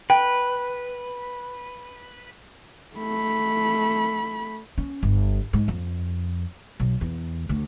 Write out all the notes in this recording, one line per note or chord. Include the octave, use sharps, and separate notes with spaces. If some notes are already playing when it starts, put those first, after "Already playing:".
B4 G5
A3 B5
C#4
G1
G#2
F2
B1
E2
D2